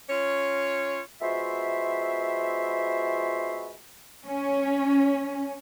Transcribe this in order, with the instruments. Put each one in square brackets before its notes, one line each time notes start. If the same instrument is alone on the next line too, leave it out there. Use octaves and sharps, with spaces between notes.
[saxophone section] C#4 F4 C#5
[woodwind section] G#3 B3 F4 F#4 C5 E5
[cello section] C#4